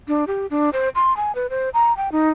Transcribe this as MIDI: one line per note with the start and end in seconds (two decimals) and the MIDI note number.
0.08 0.25 62
0.27 0.47 67
0.51 0.70 62
0.73 0.89 72
0.95 1.15 84
1.17 1.34 80
1.35 1.47 71
1.50 1.70 72
1.74 1.95 82
1.97 2.12 79
2.12 2.30 63